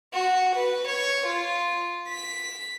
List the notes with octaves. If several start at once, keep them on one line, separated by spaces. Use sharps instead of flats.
F#4
B4
C#5
F4
B6